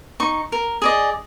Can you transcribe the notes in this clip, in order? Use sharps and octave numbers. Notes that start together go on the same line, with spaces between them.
D#4 C#6
A#4
G#4 D5 D#5